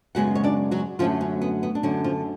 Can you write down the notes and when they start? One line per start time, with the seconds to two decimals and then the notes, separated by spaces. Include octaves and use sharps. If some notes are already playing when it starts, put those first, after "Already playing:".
0.15 F#2 C#3 G#3 B3 F#4 F#5
0.35 C#5
0.44 D4 D5
0.71 F#3 F#4
0.99 F#2 D3 F3 F#3 A3 F4
1.21 C#4
1.42 B3
1.63 B3
1.75 D4
1.83 F#2 D3 F#3 C#4
2.04 F3 F4